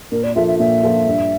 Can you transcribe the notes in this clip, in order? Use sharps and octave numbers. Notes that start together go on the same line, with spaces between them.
A#2 A#4
D5
F3 A#3 F4 A4 E5
E5
A#2 E5
F3 A#3 F4 A4
G2